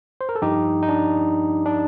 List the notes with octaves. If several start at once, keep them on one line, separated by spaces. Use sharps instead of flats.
C5
A#4
A4
G2 F3 D#4 G4
D#4
D4
D4